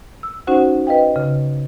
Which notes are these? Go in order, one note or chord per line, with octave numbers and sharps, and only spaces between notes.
E6
C#4 D#4 F#4 C5 F#5
B4 D#5 F5 G5
C#3